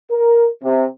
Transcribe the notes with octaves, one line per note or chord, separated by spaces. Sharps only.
A#4
C3